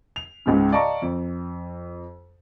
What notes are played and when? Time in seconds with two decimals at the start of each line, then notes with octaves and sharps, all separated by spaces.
0.16 F7
0.46 C#2 G#2 C#3
0.72 D5 D#5 F5 A5 A#5 C#6
1.02 F2